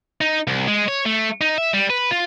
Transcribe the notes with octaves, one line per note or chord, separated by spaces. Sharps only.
D#4
C2
G#3
C#5
A3
D#4
E5
G3
B4
F4